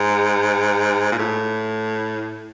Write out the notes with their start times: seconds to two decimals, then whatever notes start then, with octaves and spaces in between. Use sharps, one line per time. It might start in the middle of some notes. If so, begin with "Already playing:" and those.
Already playing: G#2
1.12 A#2
1.18 A2